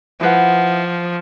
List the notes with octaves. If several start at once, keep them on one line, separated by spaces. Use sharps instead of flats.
F3 E4 B4 F#5